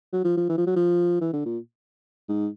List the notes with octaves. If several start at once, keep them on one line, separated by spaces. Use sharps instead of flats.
F#3
F3
F3
E3
F3
F#3
F3
E3
D3
A#2
G#2